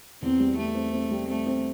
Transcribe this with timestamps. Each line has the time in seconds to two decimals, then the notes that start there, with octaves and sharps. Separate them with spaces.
0.22 E2 C4
0.39 G3
0.57 G3 A3
0.75 C4
0.93 C4
1.11 G3
1.28 A3 C4
1.46 C4